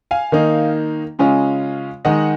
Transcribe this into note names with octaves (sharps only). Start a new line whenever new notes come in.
F5 G#5
D#3 A#3 D#4
C#3 G#3 C#4 F4
D#3 G#3 D#4 D#5 F#5